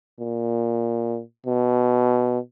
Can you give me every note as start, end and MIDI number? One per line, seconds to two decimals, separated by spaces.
0.20 1.21 46
1.46 2.39 47